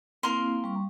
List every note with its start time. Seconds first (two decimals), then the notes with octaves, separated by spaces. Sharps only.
0.23 A#3 C4 E4 A#4 F5 C6
0.64 G3 C#6